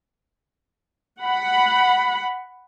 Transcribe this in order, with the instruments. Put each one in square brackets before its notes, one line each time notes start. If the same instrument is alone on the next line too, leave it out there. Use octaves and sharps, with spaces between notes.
[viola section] F#5 B5